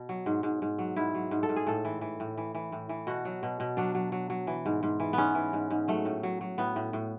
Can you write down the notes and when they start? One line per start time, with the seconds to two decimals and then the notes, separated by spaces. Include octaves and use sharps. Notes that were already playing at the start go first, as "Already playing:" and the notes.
Already playing: B2
0.09 F#3
0.26 G#2
0.43 G#2
0.62 G#2
0.79 F#3
0.96 G#2 E4
1.15 F#3
1.31 G#2
1.43 A4
1.49 G#2
1.56 G#4
1.67 A2 A4
1.85 E3
2.01 E3
2.20 A2
2.38 E3
2.55 E3
2.72 A2
2.89 E3
3.07 B2 F#4
3.25 F#3
3.43 B2
3.60 B2
3.77 F#3 D4
3.95 F#3
4.12 F#3
4.30 F#3
4.47 E3
4.66 G#2
4.83 G#2
5.00 E3
5.13 G#2 B3 C#4
5.35 E3
5.53 G#2
5.71 G#2
5.88 F#3 A3
6.05 A2
6.23 F#3
6.41 F#3
6.58 A2 B3
6.76 A2
6.93 A2